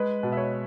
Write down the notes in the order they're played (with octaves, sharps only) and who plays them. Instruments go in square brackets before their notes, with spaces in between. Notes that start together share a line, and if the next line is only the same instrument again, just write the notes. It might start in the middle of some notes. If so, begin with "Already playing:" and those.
Already playing: [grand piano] G#3 B4
B2
E5
C#5